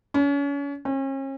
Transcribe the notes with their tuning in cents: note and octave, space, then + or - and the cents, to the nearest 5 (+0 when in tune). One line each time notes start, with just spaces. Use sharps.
C#4 +35
C#4 -40